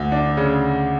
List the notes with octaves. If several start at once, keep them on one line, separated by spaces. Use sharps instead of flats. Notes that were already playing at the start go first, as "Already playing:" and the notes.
Already playing: D2
D4
C#3